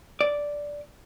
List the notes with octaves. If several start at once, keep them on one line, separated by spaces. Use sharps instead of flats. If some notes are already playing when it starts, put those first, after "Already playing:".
D5